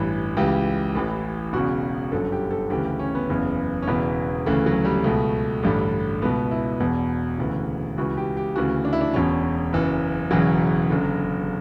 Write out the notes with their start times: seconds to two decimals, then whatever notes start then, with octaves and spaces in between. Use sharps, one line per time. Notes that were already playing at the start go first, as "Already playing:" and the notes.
Already playing: A1 G2 E3
0.37 C#2 C#3 E3 G4
0.95 A1 A2 E3
1.53 E1 E2 C#3 F#4
2.12 G1 F#2 D3 A4
2.32 G4
2.51 A4
2.70 D2 C#3 E3 G4
2.85 G4
2.99 C#4
3.15 B3
3.30 F#1 E2 C#3 E3
3.82 C#4
3.87 E1 E2 C#3 E3 B3
4.46 D2 C#3 E3 A3
4.66 F#3
4.85 G3
5.04 C#2 B2 A3
5.63 A1 G2 D3
6.22 C#2 B2 B3
6.51 E4
6.80 E1 E2 B2
7.38 E1 D2 C#3 E3
7.97 C#2 C#3 E3 F#4
8.17 G4
8.37 G4
8.55 D2 C#3 E3 F#4
8.85 D4
8.93 E4
9.01 D4
9.14 E1 E2 B2 C#4
9.73 F#1 F#2 E3
10.31 E1 E2 C#3 E3 F#3
10.89 F#1 F#2 D3